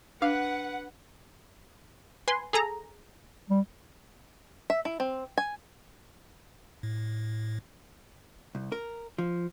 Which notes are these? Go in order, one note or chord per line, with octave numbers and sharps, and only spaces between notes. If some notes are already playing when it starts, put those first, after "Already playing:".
D4 B4 F5 F#5
B4 G#5 C6
G#4 A4 A#5
G3
E5
E4
C4
G#5
A2
C2
A#4
F3